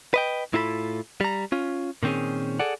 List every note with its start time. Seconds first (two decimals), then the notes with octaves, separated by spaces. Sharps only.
0.14 B4 D#5 G5
0.53 A2 E4 F4 A4 A#5 B5
1.21 G3 A#5
1.52 C#4 F4
2.03 A#2 D#3 C4 C#4 G#4
2.59 G#4 A4 D5 F#5